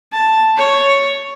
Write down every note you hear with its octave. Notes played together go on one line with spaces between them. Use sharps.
A5
C#5